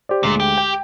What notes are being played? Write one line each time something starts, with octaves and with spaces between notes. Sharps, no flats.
G4 C5 D5
D2 A#2 G#3
G4
G5